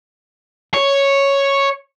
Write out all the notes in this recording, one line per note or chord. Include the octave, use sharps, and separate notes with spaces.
C#5